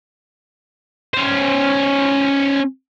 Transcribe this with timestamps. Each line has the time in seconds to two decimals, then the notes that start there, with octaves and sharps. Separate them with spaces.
1.14 C#4 C5